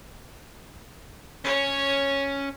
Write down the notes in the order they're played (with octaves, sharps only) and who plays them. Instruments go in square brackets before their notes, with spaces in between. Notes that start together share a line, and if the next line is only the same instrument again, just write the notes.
[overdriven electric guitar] C#4 [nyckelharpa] C#5